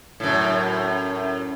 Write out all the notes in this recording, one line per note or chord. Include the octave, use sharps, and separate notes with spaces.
F#2 A2